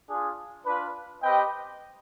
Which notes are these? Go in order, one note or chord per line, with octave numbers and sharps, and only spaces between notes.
D4 F4 G#4
D4 F4 B4
C4 G4 B4 D#5 G5